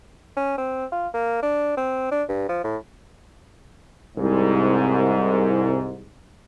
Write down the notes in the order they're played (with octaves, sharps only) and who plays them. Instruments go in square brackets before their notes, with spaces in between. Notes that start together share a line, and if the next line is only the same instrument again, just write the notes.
[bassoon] C#4
C4
F4
A#3
D4
C4
D4
G2
F3
A2
[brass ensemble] C2 G#2